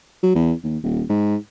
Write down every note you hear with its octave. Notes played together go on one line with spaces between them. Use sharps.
F#3
E2
D#2
D#1
G#2